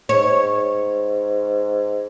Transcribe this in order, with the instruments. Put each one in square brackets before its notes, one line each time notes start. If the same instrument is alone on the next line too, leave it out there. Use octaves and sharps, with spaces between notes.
[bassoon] G#2 [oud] C#5